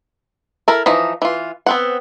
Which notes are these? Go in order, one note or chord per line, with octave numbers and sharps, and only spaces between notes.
E4 A4 A#4
E3 F3 D#4
E3 F4
B3 C4 F#5